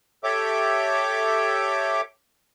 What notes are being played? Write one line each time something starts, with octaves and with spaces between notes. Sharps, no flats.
G4 A4 C#5 E5 D6